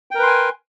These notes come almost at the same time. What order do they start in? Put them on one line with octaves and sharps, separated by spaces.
G5 A#4 B4 C6 G#5